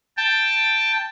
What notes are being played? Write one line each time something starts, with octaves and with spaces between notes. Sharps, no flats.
G5 A5